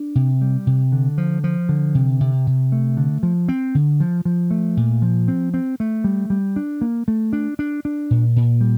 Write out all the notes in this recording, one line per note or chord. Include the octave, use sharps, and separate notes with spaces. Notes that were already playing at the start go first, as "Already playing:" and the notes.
Already playing: D4
C3
G3
C3
D3
F3
F3
D3
C3
C3
C3
A3
D3
F3
C4
D3
F3
F3
A3
A#2
F3
C4
C4
A3
G3
G3
D4
A#3
A3
D4
D4
D4
A#2
A#2
G3